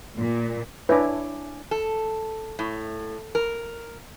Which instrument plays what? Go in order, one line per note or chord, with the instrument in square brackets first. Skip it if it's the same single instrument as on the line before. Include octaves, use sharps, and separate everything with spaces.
[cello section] A#2
[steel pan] D4 E4 [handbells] B4 [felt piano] C#5 G#5 D6
[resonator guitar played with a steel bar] A4
A2
A#4